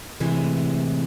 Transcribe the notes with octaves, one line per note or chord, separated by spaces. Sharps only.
A2 C3 E3 G#3